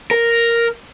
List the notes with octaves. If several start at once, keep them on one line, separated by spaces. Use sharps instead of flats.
A#4